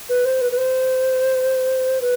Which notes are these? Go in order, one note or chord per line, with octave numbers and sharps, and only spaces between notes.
B4
C5
B4
B4
C5
B4